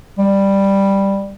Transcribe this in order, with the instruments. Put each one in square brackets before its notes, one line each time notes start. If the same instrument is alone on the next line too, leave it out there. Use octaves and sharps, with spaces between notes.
[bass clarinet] G3